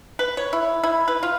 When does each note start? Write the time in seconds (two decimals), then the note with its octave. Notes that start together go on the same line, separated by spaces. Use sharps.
0.19 B4
0.37 C#5
0.53 E4
0.84 E4
1.08 B4
1.23 F4